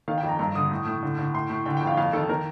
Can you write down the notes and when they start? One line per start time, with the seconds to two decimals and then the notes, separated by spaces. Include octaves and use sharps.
0.08 D#3 F5
0.18 G5
0.23 F2
0.29 A#5
0.39 G2 A#5
0.55 D3 D#6
0.71 A2
0.86 A2
1.03 D3
1.18 D3
1.34 A2 C6
1.50 A2
1.66 D3 G5
1.77 G5
1.82 F2
1.87 F5
1.97 F2 F5
2.13 D#3 A4
2.29 D#3 A#4